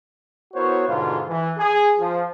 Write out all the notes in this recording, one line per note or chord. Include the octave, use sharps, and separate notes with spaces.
B3 E4 F#4 A#4 C5 C#5
G#2 B2 D3 F4
E3
G#4
F3